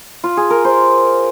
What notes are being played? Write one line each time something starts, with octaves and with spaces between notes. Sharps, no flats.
F4
G#4
A#4
C5